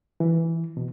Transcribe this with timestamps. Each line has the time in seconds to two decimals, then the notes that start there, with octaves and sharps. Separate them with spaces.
0.20 E3
0.77 B2